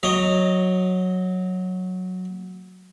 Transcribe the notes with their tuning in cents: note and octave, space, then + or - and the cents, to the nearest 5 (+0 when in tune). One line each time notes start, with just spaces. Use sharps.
F#3 -10 D#5 +0 A#5 +0